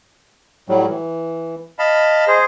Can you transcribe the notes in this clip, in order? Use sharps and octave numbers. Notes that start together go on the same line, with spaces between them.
A2 F#3 G3
E3
D#5 F5 A5 B5
G#4 C5